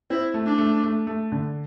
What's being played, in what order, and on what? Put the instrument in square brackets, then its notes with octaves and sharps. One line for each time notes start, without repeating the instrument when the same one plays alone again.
[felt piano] C4 [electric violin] E4
[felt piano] A3
[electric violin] D4
[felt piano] A3
A3
A3
D3